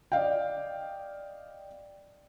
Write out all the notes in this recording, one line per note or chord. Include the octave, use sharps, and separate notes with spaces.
D5 D#5 F5 G5